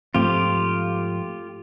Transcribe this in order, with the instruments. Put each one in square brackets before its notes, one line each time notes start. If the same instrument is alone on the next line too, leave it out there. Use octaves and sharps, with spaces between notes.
[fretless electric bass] G#2 F3 C4 [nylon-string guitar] A3 [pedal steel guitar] F4 G4